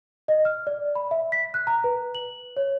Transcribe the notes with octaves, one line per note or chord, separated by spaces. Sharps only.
D#5
F6
D5
B5
E5
B6
F#6
A#5
B4
F#7
C#5